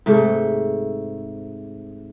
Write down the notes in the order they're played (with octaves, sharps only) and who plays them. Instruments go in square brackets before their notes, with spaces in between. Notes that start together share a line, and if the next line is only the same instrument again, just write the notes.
[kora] G#2 C3 A3